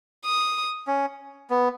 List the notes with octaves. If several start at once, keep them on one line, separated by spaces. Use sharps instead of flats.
D#6
C#4
B3